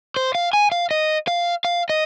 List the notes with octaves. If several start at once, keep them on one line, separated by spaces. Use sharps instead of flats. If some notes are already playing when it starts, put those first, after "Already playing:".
C5
F5
G#5
F5
D#5
F5
F5
D#5